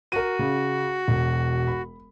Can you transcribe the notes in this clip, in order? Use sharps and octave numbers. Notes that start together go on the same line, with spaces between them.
F#4 A#4 D#7
C#3
E1
B5